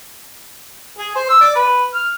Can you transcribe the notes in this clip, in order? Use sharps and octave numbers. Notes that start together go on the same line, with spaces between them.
G#4
C5
E6
D5
B4
F6